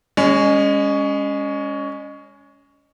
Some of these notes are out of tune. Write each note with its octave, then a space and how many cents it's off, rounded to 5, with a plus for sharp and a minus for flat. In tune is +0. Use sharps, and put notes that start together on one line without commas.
G#3 -25 C#4 +15